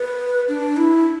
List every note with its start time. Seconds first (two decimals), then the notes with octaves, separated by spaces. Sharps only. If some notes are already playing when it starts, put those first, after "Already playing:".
Already playing: B4
0.48 D4
0.77 E4